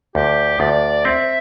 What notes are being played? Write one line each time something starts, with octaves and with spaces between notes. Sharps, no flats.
D2 G4
D2 D5
C4 E5